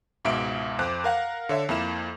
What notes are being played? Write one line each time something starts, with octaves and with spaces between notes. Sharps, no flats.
C#2 G#2 B2 E5 D7
F2 C5 D6 F#6
A#4 F5 F#5
D3 C#5 E5
F2 A#3 E4 E7